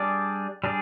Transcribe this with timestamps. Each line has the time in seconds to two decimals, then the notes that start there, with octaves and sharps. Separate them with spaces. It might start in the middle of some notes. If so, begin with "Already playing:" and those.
Already playing: G3 D4 G#4 D5
0.64 G3 D4 G#4 D5